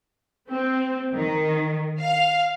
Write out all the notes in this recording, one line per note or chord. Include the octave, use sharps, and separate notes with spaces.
C4
D#3
F5